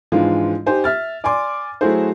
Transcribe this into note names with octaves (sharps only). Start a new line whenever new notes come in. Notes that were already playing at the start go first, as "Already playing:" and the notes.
G#2 E3 F3 G#3 D4 F4
D#4 G4 C5 G#5
E5 F6 A6
D5 G#5 C6 D6
F#3 A3 E4 F#4 G#4 C5